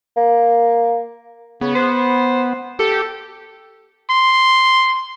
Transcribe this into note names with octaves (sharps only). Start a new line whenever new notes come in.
A#3
C#3 B3
C5
G4 A4
C6